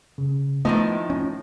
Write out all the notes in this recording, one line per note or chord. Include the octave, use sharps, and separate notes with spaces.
C#3
A2 D#3 F3 A3 B3 D#5 E5
C#4